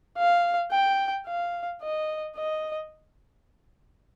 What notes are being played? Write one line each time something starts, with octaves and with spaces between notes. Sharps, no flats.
F5
G5
F5
D#5
D#5